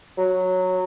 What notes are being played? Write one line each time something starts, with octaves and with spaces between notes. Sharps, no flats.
F#3